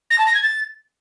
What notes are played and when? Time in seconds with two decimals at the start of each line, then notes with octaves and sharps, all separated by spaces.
0.10 A#6
0.18 A5
0.26 A#6
0.34 G#6
0.42 A6